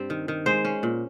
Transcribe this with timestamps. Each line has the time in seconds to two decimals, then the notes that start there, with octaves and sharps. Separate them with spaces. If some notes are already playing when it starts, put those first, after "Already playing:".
Already playing: G2 G3 C4
0.10 D#3
0.28 D#3
0.46 G#3 C5
0.65 C#4
0.83 A#2